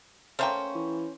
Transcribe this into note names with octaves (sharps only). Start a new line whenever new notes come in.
A3 A#3 C#4 C5 G5
E3